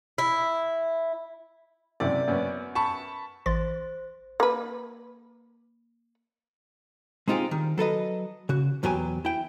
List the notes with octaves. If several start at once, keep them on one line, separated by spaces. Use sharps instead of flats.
E4
F#2 C3 E4 D5
F#2 B3 C#4
A5 B5 C#6
A1 C5 C6 A6
A#3 B4
G#3 C4 D#4 F4 G4 G#4
D#3 G3
F#3 A4 B4 D#5
C#3 F#4
B1 E2 B2 F#3 G4 G#5
E4 G5